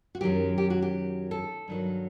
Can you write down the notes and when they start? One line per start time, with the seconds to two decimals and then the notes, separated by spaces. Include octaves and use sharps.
0.15 F#4
0.21 F#2 D#3 F#3 G4
0.58 G4
0.70 F#4
0.82 G4
1.31 A4
1.68 G2 D#3 F#3